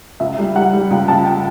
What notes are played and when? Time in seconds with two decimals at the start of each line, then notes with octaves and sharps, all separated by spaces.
0.20 C#2 E5
0.38 G3
0.55 G3 F#5
0.73 G3
0.90 C#2 G5
1.08 C#2 A5
1.26 G5